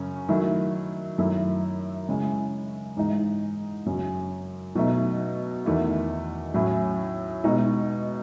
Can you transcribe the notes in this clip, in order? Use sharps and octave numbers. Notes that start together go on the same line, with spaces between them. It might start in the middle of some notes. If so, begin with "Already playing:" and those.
Already playing: F#2 C#3 C#4
D#3 F#3 A3 E4
F#2 D#3 A3 E4
C#3 G#3 C#4 E4
G#2 E3 G#3 D#4
F#2 C#3 F#3 C#4
B2 F#3 A3 D#4
E2 D#3 A3 E4
A2 F#3 C#4 E4
B2 G#3 D#4